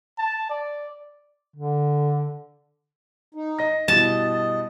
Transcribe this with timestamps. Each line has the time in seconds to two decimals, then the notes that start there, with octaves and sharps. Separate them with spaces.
0.19 A5
0.50 D5
1.56 D3
3.35 D#4
3.59 D#5 A#6
3.88 G2 B2 E4 D#5 A5